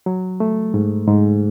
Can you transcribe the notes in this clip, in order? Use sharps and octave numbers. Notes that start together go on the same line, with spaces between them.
F#3
A3
G#2
G#2